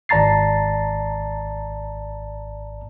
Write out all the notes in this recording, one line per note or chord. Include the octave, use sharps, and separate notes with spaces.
G#1 D5 A5 A#5 A6 C7